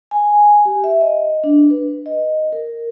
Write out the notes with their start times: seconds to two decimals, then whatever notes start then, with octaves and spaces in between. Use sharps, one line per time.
0.11 G#5
0.65 G4
0.84 E5
1.01 D#5
1.44 D4
1.70 B4
2.06 D#5
2.52 A#4